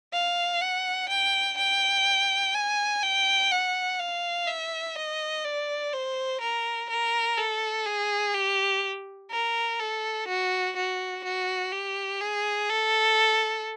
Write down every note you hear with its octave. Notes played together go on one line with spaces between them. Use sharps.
F5
F#5
G5
G5
G#5
G5
F#5
F5
E5
D#5
D5
C5
A#4
A#4
A4
G#4
G4
A#4
A4
F#4
F#4
F#4
G4
G#4
A4